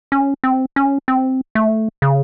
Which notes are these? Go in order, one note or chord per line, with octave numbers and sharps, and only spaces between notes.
C#4
C4
C#4
C4
A3
C#3